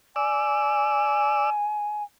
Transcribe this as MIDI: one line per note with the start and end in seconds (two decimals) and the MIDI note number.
0.16 1.50 74
0.16 2.03 80
0.16 1.50 88